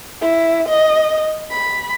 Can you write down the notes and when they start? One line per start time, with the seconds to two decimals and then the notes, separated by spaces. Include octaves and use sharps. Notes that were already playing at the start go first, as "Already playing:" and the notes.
0.21 E4
0.68 D#5
1.51 B5